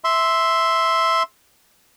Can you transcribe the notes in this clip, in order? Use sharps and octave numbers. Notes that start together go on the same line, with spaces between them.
E5 C6